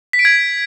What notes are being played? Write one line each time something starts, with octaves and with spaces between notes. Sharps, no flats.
B6
D7
G#6